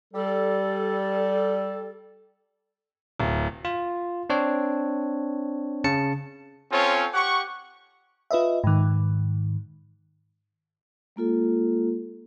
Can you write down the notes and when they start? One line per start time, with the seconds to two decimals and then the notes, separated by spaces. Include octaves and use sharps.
0.14 G3 A4
3.19 D1
3.65 F4
4.30 C4 D4 C#5
5.84 C#3 A5 C#7
6.72 C4 C#4 F4 A4 C#5
7.14 G4 F#5 C#6
8.31 F4 B4 D#5 E5
8.64 G#2 D#3
11.16 G#3 A#3 F4 A4